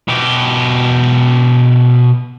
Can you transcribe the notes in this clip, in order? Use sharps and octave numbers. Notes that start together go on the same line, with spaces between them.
B2 G4